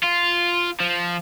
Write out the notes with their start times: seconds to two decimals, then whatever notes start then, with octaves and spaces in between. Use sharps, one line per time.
0.03 F4
0.80 F3